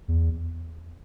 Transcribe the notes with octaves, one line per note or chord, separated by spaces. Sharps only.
E2